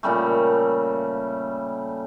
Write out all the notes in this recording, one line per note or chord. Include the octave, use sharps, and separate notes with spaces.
A#2 C#3 G3 A3